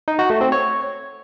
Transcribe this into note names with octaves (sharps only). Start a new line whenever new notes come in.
D#4
F#4
A3
C4
C#5